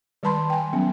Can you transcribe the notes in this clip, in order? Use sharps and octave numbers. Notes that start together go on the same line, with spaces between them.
D#3 G3 B4 A5 B5 C6
G5 G#5
F#3 B3 C#4